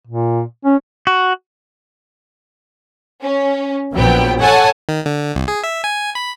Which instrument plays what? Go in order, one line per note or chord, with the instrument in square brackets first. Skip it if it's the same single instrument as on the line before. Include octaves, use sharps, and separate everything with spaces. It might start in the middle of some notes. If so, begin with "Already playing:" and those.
[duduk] A#2
C#4
[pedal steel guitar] F#4
[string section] C#4
A#1 F#3 B3 G5
A4 C#5 F#5 G#5 A5
[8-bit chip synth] D#3
D3
C2
G#4
E5
G#5
B5